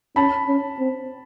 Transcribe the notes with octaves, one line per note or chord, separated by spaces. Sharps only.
C#4 A5 B5
C#4
C4